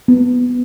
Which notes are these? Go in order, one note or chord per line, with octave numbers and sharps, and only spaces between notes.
B3